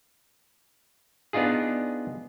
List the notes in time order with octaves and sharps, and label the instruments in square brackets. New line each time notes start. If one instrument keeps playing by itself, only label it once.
[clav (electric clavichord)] B3 D4 D#4 F4 G#4